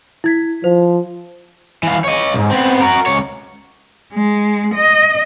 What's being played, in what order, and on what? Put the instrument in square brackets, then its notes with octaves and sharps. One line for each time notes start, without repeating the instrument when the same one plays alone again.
[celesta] E4 G#6 B6
[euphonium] F3 [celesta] C5
[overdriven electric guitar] E3 F5
C#5 D#5
B1 G#2
B3 C4
F#4 A#4
C#2 C#5
[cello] G#3
D#5